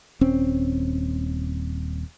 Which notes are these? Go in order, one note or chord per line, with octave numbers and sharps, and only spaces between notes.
D#1 C4 C#4